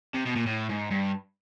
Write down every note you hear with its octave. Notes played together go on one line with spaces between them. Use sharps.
C3
B2
A#2
A2
G#2
G2